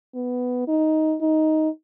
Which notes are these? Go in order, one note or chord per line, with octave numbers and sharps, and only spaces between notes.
B3
D#4
D#4